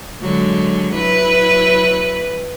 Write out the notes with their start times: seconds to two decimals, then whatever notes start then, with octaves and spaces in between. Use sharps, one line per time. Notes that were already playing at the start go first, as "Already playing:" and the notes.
0.22 D3 F#3 G#3
0.94 F#3 E4 B4